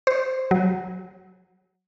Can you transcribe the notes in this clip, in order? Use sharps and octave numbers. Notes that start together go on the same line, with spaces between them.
C5
F#3